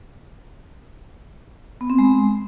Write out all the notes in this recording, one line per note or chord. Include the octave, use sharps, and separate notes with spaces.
B3
C4
G#3